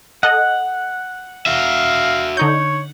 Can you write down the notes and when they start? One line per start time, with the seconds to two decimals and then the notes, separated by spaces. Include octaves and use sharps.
0.23 A4 D#5 F#5
1.46 F#4 E5 F5
2.37 D3 D#4 C#5 G6